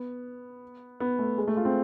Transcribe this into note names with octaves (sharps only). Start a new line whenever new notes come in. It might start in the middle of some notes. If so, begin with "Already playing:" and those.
Already playing: B3
B3
A3
G#3
A3
F4
C4